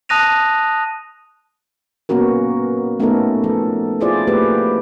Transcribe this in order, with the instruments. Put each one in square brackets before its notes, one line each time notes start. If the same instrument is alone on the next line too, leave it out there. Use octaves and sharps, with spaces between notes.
[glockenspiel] A5 D#6 F#6 A#6 D#7 F7
[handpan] A#3 B3 C#4 F#4 A#4
A3 B3 C#4 D#4 A4 A#4
F3 A4
E4 F4 G#4 C5 D5
A3 A#3 G4 G#4 B4